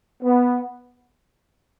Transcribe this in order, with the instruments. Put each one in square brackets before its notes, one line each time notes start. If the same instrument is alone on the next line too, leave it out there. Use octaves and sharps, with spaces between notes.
[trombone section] B3